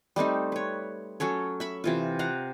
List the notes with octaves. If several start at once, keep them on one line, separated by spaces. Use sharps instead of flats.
G3 A3 C4 D#4
B4 C#5
F#3 C#4 A4 C#5
E5 B5 C#6
C3 E3 F4
F5 F#5 A#5